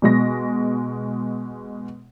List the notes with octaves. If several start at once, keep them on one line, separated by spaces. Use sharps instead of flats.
B2 G#3 A#6